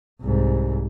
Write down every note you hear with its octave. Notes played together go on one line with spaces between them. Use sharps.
C2 G#2